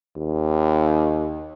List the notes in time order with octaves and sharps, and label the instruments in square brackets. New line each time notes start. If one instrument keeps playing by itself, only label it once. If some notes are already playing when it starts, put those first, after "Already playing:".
[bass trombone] D#2